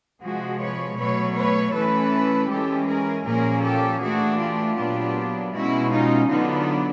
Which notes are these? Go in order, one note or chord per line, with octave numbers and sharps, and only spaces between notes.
C3 F3 G#3 F#4 G#4
B4 C#5
B2 F#3 A3 B4 C#5
B4 C#5
E3 A3 C#4 A4 B4
E3 G#3 C#4 G4 A4
G#4 A#4
A#2 F3 A#3 C#4 G#4 A#4
G4 A4
E3 A3 D4 F#4 G#4
F4 G4
A#2 F#3 B3 D4
B2 G#3 C#4 E4 F#4
D#4 F4
D3 F#3 B3 D4 D#4 F4